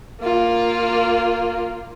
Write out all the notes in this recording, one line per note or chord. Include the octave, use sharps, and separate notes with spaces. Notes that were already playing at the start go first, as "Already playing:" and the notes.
A#3 F4